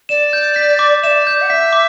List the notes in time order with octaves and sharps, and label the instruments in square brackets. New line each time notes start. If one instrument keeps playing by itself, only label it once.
[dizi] D5 [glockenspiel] E7
[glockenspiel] G6
B6
D6
[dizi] D5 E5 [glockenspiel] E7
[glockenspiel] G6
[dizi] F#5
[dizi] E5 [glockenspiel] B6
[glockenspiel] D6